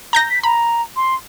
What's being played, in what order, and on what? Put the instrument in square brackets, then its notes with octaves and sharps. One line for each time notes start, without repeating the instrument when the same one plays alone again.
[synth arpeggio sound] A#5 G6 A#6
[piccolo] B6
[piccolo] A#5 [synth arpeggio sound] B5
[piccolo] C6